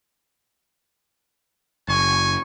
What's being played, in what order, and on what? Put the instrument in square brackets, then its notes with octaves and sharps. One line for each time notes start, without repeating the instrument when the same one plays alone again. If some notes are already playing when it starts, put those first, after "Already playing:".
[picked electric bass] F#1 [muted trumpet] G#5 [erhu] C#6